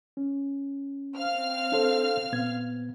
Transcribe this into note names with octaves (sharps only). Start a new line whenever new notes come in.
C#4
C4 F5 F6
D4 A4 C5
A#2 B3 G#6